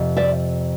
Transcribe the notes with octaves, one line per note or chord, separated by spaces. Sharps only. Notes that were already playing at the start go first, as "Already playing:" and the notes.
Already playing: F2 C3
D5 E5